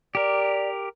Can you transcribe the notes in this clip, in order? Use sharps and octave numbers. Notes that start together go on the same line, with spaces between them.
G4 A#4 D5